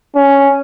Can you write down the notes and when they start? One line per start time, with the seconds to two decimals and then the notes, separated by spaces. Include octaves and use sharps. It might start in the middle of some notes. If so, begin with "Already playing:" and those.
0.15 C#4